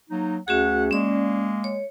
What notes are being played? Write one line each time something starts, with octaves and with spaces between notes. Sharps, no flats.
F#3 A#3 D#4
D2 A3 C#4 F#4 G#4 F#5
G#3 A#3 C#4 D5
C#5